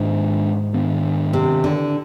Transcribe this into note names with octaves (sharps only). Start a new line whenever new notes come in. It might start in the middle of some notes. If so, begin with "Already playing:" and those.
Already playing: G#2 D#3 G#3 D4
D#3 B3 D4
C3
D3